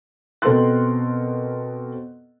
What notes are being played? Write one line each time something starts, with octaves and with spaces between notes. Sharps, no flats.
B2 C4 A4 A#4 C6 F#6